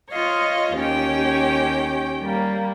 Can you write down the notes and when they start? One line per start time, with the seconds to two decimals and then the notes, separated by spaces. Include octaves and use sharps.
0.11 F4 C#5 D#5 F5
0.75 D#2 C#4 G4 G5
2.22 G3 A#3